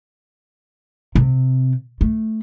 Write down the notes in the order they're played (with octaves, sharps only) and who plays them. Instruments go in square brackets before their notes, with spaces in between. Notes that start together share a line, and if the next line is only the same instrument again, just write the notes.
[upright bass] C3
A3